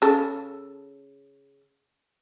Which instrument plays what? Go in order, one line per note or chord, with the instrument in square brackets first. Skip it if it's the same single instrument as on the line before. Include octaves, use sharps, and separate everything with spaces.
[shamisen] C#3 A4